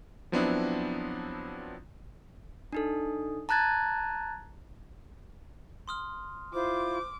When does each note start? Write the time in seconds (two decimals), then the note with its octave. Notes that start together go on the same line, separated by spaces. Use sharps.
0.32 F3 F#3 B3 C4 D4 E4
2.72 D4 D#4 A4
3.49 A5 A#5 F#6 G#6 A6
5.88 C6 D#6 F6
6.54 E4 F4 C5 D6